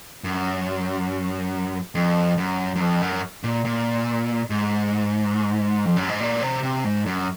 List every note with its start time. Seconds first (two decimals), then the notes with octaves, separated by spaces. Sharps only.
0.24 F#2
1.95 F2
2.37 F#2
2.76 F#2
2.80 F2
3.01 F#2
3.44 A#2
3.65 A#2
4.50 G#2
5.85 F2
5.97 F#2
6.08 G#2
6.20 A#2
6.42 C3
6.63 C3
6.84 G#2
7.06 F#2